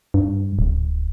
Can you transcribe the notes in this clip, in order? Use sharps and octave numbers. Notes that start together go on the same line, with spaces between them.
G2
D1